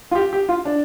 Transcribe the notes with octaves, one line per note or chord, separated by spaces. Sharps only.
F4
G4
G4
F4
D4